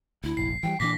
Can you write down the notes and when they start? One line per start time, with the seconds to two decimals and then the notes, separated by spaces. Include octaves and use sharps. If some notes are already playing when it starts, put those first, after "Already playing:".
0.24 D2 E4
0.37 F1 A#1 C7
0.63 E3 F#3 G3 G5
0.80 A#2 E3 D4 D6 A#6 B6